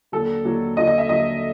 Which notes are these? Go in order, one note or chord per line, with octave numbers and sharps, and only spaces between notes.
D#2 D3 F#3 A4
D#2 D3 F#3
D#2 D3 F#3 D#5
D#5
E5
D#2 D3 F#3 D#5